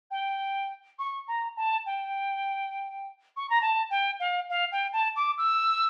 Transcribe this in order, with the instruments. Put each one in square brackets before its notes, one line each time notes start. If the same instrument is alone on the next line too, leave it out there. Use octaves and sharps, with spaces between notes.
[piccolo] G5
C#6
A#5
A5
G5
C#6
A#5
A5
G5
F5
F5
G5
A5
D6
E6